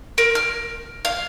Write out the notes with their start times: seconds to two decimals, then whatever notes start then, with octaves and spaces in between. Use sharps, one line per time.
0.18 A#4
0.35 F6
1.05 F5